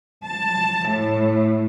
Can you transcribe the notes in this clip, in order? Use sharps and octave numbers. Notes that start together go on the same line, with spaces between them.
A5
A2